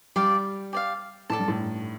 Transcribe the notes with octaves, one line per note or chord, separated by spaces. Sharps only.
G3 G4 D5 F5
G4 D5 F5
A2 A4 D5 A5
G2
A2